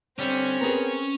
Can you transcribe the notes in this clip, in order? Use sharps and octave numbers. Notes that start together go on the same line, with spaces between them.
D3 G3 C4 C#4
B3 G#4 A#4 A#5